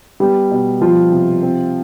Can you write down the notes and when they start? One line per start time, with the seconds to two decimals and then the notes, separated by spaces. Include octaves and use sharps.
0.20 G3 B3 G4
0.51 B2
0.81 F3 G3 F4
1.12 C3
1.43 C4